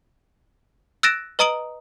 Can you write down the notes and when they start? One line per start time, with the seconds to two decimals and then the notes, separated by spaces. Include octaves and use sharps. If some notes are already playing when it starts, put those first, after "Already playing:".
1.03 E6 F#6 A6 A#6 D7 E7
1.39 B4 D#5 A#5 D#6 D7 F#7